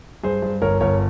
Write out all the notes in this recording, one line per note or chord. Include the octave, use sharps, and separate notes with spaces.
G2 G#4 C5
G2
G1 A#4 C#5
G1 A#4 C#5